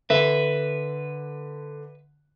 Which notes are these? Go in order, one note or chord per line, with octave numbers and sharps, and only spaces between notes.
D3 B4 E5